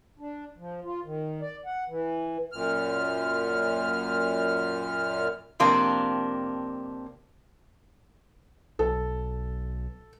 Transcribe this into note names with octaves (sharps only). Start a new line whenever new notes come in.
D4
F3
F4
D#3
D5
F#5
E3
F#2 A#2 F6
F2 C3 A#3 D4
B1 A4